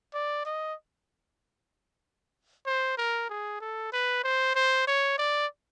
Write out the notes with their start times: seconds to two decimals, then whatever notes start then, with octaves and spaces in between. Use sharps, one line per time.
0.14 D5
0.45 D#5
2.66 C5
2.98 A#4
3.29 G#4
3.60 A4
3.93 B4
4.24 C5
4.55 C5
4.87 C#5
5.18 D5